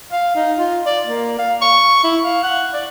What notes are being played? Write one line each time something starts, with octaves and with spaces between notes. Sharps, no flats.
F5
D#4
F4
D5
A#3
F5
C#6
E4
F5
F#5
D5